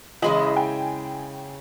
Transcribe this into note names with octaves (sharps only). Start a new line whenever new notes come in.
C#3 E3 G#3 E4 D#5 F#7
G5 G#5